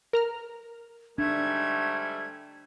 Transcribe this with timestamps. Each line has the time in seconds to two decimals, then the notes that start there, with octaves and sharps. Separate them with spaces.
0.13 A#4 A#5 F6
1.18 G#2 G3 A3 D4 G#6